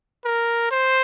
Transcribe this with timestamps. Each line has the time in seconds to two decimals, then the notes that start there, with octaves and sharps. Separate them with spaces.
0.25 A#4
0.71 C5